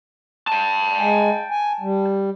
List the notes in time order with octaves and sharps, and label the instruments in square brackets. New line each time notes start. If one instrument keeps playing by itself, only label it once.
[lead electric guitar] G5 A5
[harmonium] G#3 G#5
G#5
G3